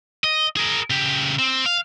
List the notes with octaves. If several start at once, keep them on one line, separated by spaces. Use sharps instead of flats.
D#5
G#4 A#4
C#3 G4
C4
F5